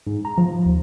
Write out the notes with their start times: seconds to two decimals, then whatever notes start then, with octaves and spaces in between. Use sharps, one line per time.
0.06 G#2
0.25 A#5
0.38 F3
0.66 D#2